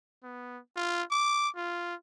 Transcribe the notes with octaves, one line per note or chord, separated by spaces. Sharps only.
B3
F4
D6
F4